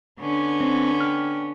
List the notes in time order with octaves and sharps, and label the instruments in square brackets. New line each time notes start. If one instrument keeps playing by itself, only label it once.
[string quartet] D3 B3 C#4
[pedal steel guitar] C4
G5 F6